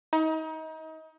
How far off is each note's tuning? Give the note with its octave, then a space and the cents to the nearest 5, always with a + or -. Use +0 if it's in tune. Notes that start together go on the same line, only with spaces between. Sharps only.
D#4 +30